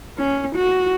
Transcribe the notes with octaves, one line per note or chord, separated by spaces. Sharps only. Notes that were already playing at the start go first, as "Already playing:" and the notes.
C#4
F#4